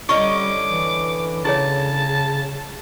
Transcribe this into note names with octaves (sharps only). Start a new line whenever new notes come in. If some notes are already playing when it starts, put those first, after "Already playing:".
D3 G3 C#4 E4 D#5 C#6 D6
E3
C#3 E4 G#4 C#5 A5